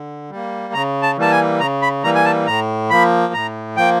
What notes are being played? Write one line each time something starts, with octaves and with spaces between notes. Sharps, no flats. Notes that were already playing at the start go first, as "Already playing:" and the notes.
Already playing: D3
G3 A#3
C#3 A#5
A5
E3 G3 A#3 A5
G#5
C#3 A#5
B5
E3 G3 A#3 A#5
G#5
A5
A2 A#5
F3 A#3 B5
A2 A#5
F3 A#3 G5